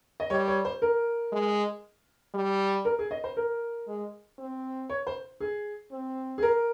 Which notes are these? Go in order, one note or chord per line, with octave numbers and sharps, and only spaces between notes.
D#5
G3 C#5
C#5
C5
A#4
G#3
G3
A#4
G#4
D#5
C5
A#4
G#3
C4
C#5
C5
G#4
C4
G#4
A#4